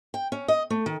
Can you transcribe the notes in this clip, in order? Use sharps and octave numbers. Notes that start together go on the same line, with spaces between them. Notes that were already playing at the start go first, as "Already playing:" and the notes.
G5
C#4
D#5
A3
D#3